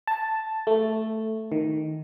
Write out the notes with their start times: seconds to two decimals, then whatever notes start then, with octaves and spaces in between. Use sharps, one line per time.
0.07 A5
0.67 A3
1.52 D#3